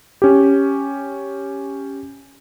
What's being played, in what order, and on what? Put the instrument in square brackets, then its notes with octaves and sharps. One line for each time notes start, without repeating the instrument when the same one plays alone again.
[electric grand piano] C#4 G4